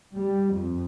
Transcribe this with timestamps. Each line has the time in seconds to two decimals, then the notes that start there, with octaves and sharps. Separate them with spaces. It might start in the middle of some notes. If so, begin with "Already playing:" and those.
0.15 G3
0.52 F2